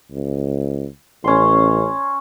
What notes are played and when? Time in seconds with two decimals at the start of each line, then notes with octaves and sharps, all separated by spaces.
0.11 C#2
1.24 A1 C#4 C6